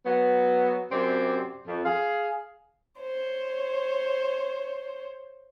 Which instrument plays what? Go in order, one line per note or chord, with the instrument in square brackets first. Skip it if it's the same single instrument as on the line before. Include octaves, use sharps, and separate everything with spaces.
[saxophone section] F#3 B3
F#2 C3 C4 G4 D5
F2
G#4 F5
[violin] C5 C#5